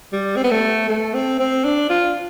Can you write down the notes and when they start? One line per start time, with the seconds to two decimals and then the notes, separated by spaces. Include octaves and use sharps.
0.12 G3
0.36 C4
0.44 B3
0.51 A3
0.89 A3
1.14 C4
1.40 C4
1.64 D4
1.90 F4